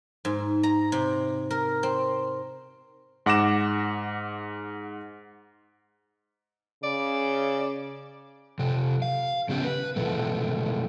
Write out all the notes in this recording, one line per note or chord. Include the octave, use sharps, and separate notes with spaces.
G#2
A#5
C3
A#4
C4
G#2 F#5 D6 A#6 E7
C#3 D5
C3 F3
F5
C#3 F3 B3 C#4 G4
B4
E2 G2 B2 F3 A3